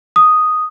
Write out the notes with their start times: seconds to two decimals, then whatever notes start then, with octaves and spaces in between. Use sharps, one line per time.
0.16 D#6